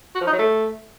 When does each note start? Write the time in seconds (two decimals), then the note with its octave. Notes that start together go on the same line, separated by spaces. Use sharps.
0.15 F#4
0.21 F3
0.27 D#4
0.33 F#3
0.39 A3